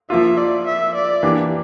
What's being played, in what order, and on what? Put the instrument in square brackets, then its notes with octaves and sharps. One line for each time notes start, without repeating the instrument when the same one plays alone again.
[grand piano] F3 A#3 F4 [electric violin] E5
[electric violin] D5
E5
D5
[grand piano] E3 A#3 D4 G4